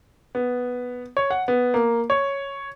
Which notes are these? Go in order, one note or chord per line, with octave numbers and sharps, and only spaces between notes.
B3
C#5
F#5
B3
A#3
C#5